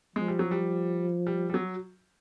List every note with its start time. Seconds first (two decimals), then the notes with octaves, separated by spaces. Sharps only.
0.16 F3 G#3
0.28 G3
0.39 F#3
0.51 G3
1.26 G3
1.50 G3
1.54 F#3